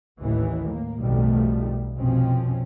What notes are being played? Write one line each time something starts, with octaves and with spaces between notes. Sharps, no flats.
A1 D#2 A2 D#3 E3
A#3
B1 F2 D#3 F3 G3 A3
C2 F2 B2 F3 C4 C#4